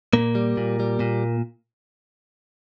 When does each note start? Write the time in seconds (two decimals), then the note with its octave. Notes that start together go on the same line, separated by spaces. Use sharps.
0.13 A#2 A#3
0.35 G3
0.57 A#2
0.80 G3
1.00 A#2